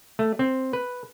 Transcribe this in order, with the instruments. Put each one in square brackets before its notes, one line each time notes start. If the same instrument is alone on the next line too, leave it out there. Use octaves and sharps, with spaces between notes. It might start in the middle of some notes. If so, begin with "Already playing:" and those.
[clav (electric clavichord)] A3
C4
B4